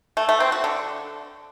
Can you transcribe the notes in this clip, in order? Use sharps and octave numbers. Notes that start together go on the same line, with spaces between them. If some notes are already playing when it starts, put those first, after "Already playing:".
A3
A3
C4
F#4
D3